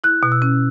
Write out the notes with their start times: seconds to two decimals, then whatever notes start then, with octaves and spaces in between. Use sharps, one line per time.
0.04 E4 F#6
0.23 B2
0.32 E6
0.42 C#4